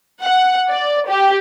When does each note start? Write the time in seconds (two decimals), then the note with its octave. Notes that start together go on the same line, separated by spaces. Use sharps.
0.21 F#5
0.69 D5
1.07 G4